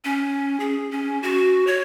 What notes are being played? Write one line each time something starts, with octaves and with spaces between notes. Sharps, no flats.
C#4
G#4
C#4
F#4
C#5